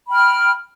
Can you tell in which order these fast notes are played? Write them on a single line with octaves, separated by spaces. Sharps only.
B5 G5 F6